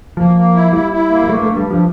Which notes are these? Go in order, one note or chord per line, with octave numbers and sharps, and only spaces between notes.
F3 A#3
A#3
E4
G3 E4
E4
A#3
G3
G2 A3
G2 A3
G3
G2 F3